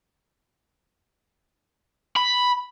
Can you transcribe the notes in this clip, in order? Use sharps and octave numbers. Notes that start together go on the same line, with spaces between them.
B5